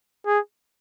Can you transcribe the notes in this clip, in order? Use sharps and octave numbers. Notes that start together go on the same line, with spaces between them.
G#4